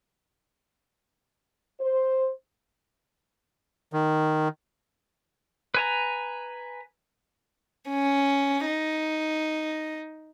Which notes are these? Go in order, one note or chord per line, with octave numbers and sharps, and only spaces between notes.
C5
D#3
B4 G#5 A#5
C#4
D#4